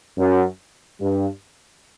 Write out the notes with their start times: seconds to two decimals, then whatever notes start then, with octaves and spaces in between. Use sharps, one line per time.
0.17 F#2
1.00 G2